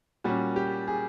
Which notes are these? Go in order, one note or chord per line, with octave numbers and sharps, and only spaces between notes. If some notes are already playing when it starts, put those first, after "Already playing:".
A#2 G3 A#3 C#4 F#4
G4
G#4